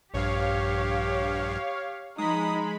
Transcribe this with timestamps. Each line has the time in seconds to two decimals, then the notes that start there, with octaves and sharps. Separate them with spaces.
0.14 A#1 G2 G4 C#5 F5
2.18 F3 G#3 D#4 B5 D#6